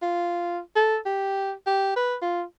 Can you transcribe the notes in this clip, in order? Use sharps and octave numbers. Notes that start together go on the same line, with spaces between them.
F4
A4
G4
G4
B4
F4